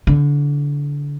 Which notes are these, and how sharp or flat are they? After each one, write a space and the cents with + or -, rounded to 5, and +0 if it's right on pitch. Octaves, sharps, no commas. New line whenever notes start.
D3 -25 E4 +0